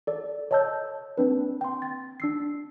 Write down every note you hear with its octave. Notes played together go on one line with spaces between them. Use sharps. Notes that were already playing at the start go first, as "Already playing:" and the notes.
A4 D5
C#5 D#5 A5 E6 G6
A#3 C4 D4 B4
G5 C6
A6
D4 E6 C7